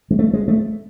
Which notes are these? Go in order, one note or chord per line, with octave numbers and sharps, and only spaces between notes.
G#3
A3
G#3
A3